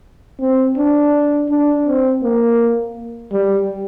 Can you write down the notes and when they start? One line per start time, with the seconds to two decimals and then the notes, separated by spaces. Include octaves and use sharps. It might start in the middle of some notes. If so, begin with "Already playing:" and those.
0.40 C4
0.77 D4
1.49 D4
1.86 C4
2.22 A#3
3.32 G3